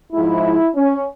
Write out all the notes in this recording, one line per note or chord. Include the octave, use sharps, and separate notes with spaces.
G#2 F3 G#3 E4
C#4